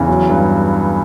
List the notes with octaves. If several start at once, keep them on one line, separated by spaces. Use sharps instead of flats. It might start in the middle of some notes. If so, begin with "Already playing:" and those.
Already playing: E2 C#3
F#3
G2